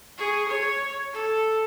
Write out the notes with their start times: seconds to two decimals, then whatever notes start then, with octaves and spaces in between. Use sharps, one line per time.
0.17 G#4 C#6
0.49 C#5
1.13 A4